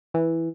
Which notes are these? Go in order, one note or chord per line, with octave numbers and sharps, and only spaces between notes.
E3